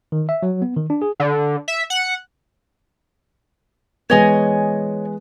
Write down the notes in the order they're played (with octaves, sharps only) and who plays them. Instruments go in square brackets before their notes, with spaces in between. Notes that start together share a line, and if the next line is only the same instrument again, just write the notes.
[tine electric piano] D#3
E5
F#3
B3
D#3
D4
G#4
[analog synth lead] D3
E5
F#5
[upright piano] E3 G#3 B3 [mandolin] C#5 D#5 G#5